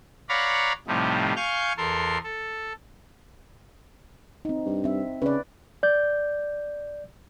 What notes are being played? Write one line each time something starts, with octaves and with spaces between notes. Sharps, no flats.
C#5 D5 F5 F#5 A#5 B5
A2 C3 F3 G3 D#4
F5 G#5 C#6 F6 G6
E2 A4 A#4 C6
A4
C4 D#4
G2
C4 E5
C#3 B4 D5
D5 G6